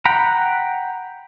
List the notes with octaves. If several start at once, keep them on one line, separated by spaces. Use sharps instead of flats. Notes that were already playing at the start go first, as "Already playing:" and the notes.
F#5 G5 A#5 B5